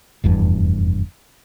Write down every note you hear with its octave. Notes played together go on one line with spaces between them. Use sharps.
F1 E2 G2